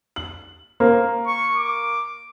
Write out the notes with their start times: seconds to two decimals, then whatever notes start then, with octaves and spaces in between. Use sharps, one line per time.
0.16 F#7
0.80 A#3 A#4 C5
1.27 C#6
1.56 D6